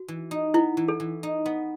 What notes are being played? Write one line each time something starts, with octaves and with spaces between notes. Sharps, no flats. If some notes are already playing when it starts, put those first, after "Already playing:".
Already playing: F#4
E3
D#4
B3 E4
E3
A4
E3
D#4
B3